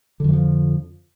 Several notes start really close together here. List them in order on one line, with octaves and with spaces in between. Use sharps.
D3 F2 E3 F3